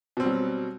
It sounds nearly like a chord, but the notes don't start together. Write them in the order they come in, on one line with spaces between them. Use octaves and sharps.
B2 C4 G3 F#3